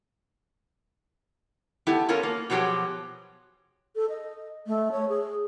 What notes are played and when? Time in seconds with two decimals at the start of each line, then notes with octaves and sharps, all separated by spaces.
1.87 A3 B3 E4 G4
2.09 B3 C#4 F4 A4 A#4
2.23 A#3
2.50 B2 F3 F#3 G#3 G4 G#4
3.96 A4
4.10 D#5
4.67 A3
4.92 C#5
5.09 G#4